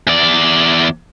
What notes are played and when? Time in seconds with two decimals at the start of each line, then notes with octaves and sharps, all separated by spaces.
0.07 E2 D5